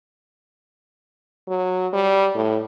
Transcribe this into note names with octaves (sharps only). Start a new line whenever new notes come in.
F#3
G3
A2